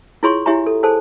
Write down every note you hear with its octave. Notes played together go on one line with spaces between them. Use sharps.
E4 F4 G#4 C#5 C6 C#6
E4 G4 C#5 E5 G#5 A#5
A4
G#4 A4 C5 G#5 A5